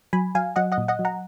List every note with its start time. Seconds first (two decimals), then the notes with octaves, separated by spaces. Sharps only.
0.13 F#3 G#5 B5
0.35 F#3 F5 G#5
0.56 F#3 D#5 F#5
0.72 D#5 F#5
0.78 A#2
0.88 D#5 F#5
0.99 F#3
1.05 F#5 A#5